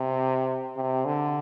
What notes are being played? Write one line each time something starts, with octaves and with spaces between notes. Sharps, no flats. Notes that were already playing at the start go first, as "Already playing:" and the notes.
Already playing: C3
C3
D3